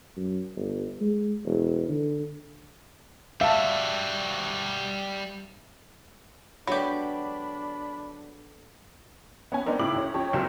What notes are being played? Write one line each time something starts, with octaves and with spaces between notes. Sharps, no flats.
F#2
G1
G#3
E1
D3
G3 F#4 E5 F5 A5
D3 F#3 G#3 B3 D4 G4 B5
B3 C#4 G#5
B3 C4 D4 D#4 A#4
A2 C#3 E4 G4 D6 F#7
D2 C#4
F2 C#4 G4 C#5
F#1 C#2 C3 F#3 E7